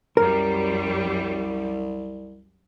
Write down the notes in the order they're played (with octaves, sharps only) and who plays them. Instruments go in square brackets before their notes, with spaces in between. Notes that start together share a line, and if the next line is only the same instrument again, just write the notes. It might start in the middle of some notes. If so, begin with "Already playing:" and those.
[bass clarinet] C2 [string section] F#2 G3 [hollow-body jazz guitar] A#4